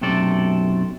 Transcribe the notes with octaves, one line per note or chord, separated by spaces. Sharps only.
B1 F#2 C3 A3 A4 D5